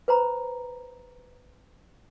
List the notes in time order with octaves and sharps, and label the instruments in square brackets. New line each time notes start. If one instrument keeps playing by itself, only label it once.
[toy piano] B4 C5 A#5 B5